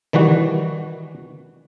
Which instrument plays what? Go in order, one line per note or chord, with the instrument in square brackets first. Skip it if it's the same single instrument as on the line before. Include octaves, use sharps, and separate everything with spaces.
[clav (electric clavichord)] D#3 E3 G3 F#4